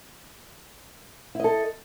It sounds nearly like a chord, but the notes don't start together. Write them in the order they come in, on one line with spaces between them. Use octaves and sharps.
E4 D#5 A4